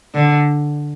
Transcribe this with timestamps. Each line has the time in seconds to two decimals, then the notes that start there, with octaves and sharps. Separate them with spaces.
0.14 D3